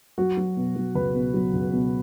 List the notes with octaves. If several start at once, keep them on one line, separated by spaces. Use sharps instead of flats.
F#3 F#4
F#3
B2
F#3
C#2 B4
B2
F#3
C#2
B2